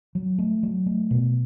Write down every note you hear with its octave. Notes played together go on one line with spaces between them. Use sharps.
F#3
A3
F#3
A3
B2